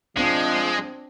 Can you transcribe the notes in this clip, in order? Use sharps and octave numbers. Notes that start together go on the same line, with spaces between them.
F3 G#3 C4 D4